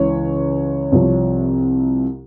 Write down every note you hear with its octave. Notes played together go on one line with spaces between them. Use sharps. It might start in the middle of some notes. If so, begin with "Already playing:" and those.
Already playing: C#2 C#3 E3 C#5
C2 C3 F3